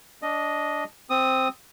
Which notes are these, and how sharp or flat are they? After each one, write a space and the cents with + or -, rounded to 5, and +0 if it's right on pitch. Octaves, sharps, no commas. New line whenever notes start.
D4 -15 D#5 +0
C4 +0 D#6 +0